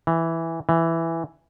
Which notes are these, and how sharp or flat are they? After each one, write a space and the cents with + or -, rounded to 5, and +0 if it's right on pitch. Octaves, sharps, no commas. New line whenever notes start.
E3 +0
E3 +5